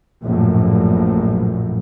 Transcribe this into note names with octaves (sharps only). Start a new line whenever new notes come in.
A#1 F#2 A2